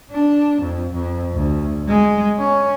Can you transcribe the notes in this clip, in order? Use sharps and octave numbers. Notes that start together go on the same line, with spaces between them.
D4
F2
F2
D2
G#3
C#4